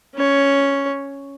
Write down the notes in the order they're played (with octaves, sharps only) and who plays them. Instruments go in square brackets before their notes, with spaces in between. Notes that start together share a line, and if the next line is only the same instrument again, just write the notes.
[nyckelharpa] C#4 C#5